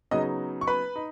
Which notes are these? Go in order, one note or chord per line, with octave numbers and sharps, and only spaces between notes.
C#3 F#3 B3 D#4 D#5 D#6
C#6
B4 B5
D#4